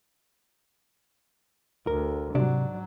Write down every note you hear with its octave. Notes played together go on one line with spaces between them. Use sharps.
D2 A#4
G#2 C3 F#3 D4